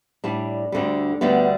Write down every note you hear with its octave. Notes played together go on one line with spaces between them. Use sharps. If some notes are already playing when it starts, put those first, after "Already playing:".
A2 G3 D4
D2 D3 G3
D2 D3 G3 B3